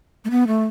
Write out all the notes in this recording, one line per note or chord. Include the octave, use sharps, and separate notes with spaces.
A3
B3
A3